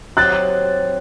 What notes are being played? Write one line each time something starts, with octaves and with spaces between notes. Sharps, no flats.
F#3 C4 D#4 G4 F#6 A6